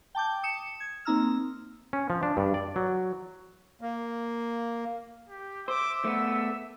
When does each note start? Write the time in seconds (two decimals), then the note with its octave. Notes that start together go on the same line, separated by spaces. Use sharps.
0.15 G5 A5 D6 G6
0.43 D#6 C#7 E7
0.80 G#6
1.05 A#3 C4 D#4 A#5 E6 F6
1.93 C#4
2.10 F3
2.23 D4
2.37 G2
2.54 D5
2.76 F#3
3.81 A#3
5.29 G4
5.68 C5 E5 D6
6.05 A3 B3 D5